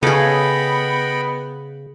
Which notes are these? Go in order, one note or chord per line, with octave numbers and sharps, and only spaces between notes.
C#3 B3 G#4 A4 D#5 G5 B5